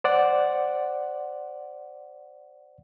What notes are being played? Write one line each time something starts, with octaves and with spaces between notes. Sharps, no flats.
C5 D5 F#5